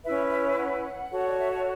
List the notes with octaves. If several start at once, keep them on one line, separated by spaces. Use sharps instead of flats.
C#4 E4 B4 E5
E5
F#5
F#4 A4 C#5
D5
E5
F#5